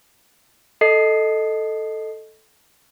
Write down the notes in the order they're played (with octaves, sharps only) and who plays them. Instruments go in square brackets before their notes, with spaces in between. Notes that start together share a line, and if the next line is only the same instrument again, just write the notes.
[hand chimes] A4 D#5 C7